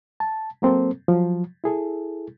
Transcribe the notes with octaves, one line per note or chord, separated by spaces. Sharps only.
A5
F#3 A#3 C4 A4 C5
F3 F#3
E4 G#4 A4